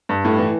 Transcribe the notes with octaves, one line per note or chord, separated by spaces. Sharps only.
G2
A2
E3